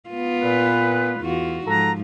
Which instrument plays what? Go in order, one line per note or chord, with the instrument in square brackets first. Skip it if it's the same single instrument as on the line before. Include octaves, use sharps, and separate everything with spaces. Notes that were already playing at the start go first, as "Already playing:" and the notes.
[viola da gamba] B3 F4
[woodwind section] A#2 B4
[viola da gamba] E2 F4 F#4
[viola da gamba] G#2 F3 [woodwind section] A4 F#5 A#5